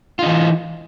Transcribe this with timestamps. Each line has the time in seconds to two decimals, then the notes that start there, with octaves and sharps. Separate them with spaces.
0.19 F4
0.23 D#4
0.26 E3